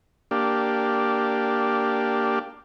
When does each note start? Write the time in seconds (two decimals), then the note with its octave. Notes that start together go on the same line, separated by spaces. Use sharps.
0.31 A#3 D4 G4